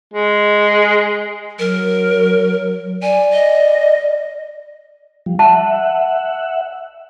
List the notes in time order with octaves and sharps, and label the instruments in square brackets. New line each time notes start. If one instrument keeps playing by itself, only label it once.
[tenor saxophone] G#3
[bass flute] F#3 [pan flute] A#4
[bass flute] D5 [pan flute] G#5
[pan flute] D#5
[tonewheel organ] F3 G3
[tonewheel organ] E5 F#5 [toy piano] A5